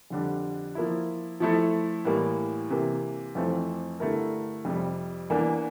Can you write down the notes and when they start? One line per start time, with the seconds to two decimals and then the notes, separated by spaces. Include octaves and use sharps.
0.10 F2 D3 G3 D4 G4
0.75 F3 A#3 E4
1.40 F3 A3 E4 A4
2.05 A2 E3 G3 A#3
2.70 C3 E3 A#3
3.35 F2 E3 A3 C4 F4
4.00 G2 D3 A3 E4 A#4
4.65 F2 C3 G3
5.30 E2 E3 A#3 D4